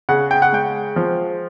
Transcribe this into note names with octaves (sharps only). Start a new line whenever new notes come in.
C#3 F#5
G5
F#5
G#3 G5
F3